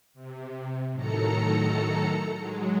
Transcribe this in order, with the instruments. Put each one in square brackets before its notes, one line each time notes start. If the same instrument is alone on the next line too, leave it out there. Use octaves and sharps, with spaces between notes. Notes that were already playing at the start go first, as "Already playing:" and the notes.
[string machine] C3
A2 D#3 F#3 A4 A#5 C#7
F#3 G#3